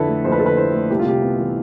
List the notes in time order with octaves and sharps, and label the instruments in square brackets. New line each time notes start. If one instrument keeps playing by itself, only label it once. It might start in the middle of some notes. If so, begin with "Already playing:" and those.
Already playing: [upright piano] F2 D3 E4 A4 B4
A3
F2 C5
B4
D3 A4
B4
E4 C5
A3
C2 G4
F4
C3 G4
B3
E3